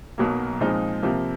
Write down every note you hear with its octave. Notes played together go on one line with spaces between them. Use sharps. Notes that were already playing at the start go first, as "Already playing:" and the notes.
B1 B2 F#3 A#3
A#2 F3 G#3 C4 D#4
C3 F3 A#3